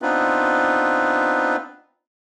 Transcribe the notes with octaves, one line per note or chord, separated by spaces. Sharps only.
B3 C4 D4 D#4 F4 B4